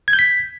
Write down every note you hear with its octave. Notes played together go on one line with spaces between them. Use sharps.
G#6
G6
B6